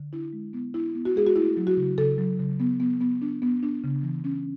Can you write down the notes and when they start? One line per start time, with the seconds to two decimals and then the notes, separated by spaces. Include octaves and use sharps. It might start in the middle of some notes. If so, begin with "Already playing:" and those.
Already playing: D3
0.13 D4 E4
0.33 G#3
0.53 B3
0.74 D4 E4
0.95 B3
1.05 F#4
1.15 G#3 G#4
1.27 F#4
1.36 A3 E4
1.57 F#3
1.67 F#4
1.77 C#3
1.98 C#3 A4
2.18 F#3
2.39 C#3
2.60 B3
2.80 B3
3.01 B3
3.22 D4
3.42 B3
3.63 D4
3.84 C#3
4.03 E3
4.24 C#4